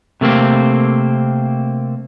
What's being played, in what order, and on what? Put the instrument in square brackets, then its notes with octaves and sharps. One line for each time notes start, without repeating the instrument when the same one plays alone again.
[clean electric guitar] C3 A3 A#3 C4